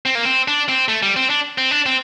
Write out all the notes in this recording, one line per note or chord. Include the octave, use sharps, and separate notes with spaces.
C4
A#3
C4
D4
C4
A3
G3
C4
D4
C4
D4
C4